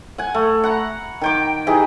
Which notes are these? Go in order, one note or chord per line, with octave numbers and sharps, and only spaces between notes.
F#5 G#5
A3
F#5 A#5 B5
D#3 G5 D6
E3 D#4 G4 G#4